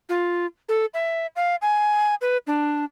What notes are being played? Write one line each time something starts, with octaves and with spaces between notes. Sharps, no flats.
F4
A4
E5
F5
G#5
B4
D4